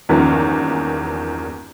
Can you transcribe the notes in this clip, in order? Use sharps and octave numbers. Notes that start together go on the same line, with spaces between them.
E2 G2 D#3 F3 A#3 C#4